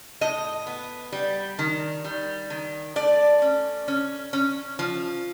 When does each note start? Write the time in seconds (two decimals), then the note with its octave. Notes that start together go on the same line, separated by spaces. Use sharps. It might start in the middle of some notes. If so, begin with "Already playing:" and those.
0.21 A2 D#5
0.67 B3
1.12 G3
1.59 D#3
2.04 G3
2.50 D#3
2.96 A3 D5
3.42 C#4
3.88 C#4
4.33 C#4
4.79 F3